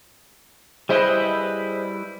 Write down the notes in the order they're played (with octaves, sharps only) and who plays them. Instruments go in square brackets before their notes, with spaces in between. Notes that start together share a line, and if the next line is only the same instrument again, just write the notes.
[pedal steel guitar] G3 E4 B4 [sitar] G#4 C5 D#5